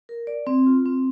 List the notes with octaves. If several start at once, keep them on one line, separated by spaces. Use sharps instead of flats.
A#4
D5
C4
F4
C4